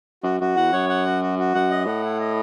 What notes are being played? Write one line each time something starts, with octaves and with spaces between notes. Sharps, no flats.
F#2 F#4
F#2 F#4
E2 F#5
F#2 C#5
F#5
F#4
F#4
F#4
F#2 F#5
D#5
A2 F#5
E4
D#5